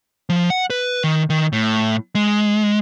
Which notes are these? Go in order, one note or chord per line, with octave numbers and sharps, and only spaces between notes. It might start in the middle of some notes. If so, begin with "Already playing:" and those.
F3
F#5
B4
D#3
D#3
A2
G#3